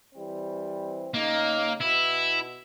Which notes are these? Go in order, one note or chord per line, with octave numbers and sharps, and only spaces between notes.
E3 G3 C4
C#3 A#3 D#4
B2 E4